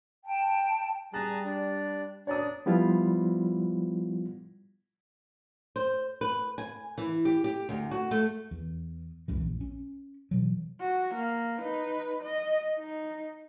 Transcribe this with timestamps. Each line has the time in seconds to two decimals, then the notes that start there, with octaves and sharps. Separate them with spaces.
0.24 G5 A5
1.14 G3 G#4 A5 A#5 F#6
1.45 D4
2.27 D4 C#5 A#5 D#6
2.66 F3 G3 B3 E4 F4
5.76 C5
6.21 B4
6.58 G#5
6.98 E3
7.25 G4
7.44 G4
7.69 D2
7.91 F#4
8.11 A3
8.51 E2
9.28 C#2 F#2 E3
9.41 A#1
9.61 C#4
10.31 B2 E3 F#3
10.81 F#4
11.14 A#3
11.58 D#4 B4
12.22 D#5
12.79 D#4